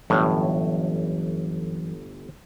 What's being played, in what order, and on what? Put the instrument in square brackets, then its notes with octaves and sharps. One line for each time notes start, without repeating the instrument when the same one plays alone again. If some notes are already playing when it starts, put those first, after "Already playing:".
[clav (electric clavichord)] G1 A2 [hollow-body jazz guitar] F#2 E3 C#5